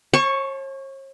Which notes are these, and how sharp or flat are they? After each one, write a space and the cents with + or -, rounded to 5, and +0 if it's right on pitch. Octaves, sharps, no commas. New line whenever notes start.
C#5 -45 A5 -20 C#6 +0